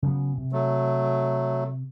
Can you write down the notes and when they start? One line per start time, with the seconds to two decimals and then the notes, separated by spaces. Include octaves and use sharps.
0.03 C#3 F#3 B3
0.38 C3
0.52 F#3 A3